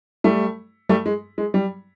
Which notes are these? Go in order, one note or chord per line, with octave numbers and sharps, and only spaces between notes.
G3 A3
G3 A3
G#3
G#3
G3